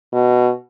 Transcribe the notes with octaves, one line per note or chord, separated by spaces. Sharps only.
B2